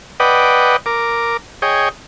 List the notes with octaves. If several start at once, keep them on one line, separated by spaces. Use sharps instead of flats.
B4 D5 D#5 F#5 G5
A#4 D6
G#4 C#5 D#5 G5